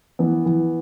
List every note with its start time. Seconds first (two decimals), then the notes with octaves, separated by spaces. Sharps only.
0.19 E3 B3
0.46 E3